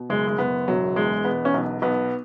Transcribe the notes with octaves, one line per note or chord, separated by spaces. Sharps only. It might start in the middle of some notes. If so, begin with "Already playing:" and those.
Already playing: B2
F#1 G#3
G#3
F#1 B3
E1 F#3
E2 G#3
E1 B3
C#4
B1 B3
B1 B3